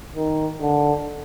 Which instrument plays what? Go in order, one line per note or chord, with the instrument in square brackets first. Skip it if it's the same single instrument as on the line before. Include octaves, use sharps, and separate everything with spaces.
[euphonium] D#3
D3